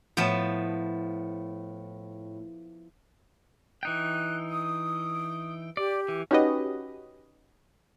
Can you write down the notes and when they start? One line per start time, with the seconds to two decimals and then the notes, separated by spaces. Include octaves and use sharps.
0.17 A2 F3 B3 A5
3.83 E3 D#4 G5 F#6
4.49 D#6
5.77 G4 D5
6.08 E3
6.31 C#4 D#4 F#4 G4 B4 D#5